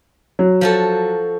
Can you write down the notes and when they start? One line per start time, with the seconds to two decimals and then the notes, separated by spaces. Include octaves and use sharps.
0.39 F#3
0.61 F3 F#4 A4